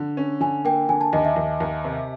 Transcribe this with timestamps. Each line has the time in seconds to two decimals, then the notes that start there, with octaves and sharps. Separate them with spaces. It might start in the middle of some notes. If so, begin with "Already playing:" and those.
Already playing: D3
0.17 C#4
0.41 D3 G#5
0.65 A#3 G5
0.89 D3 G#5
1.01 A5
1.13 D#2 D#5
1.25 E5
1.36 D#2
1.60 D#2
1.85 C3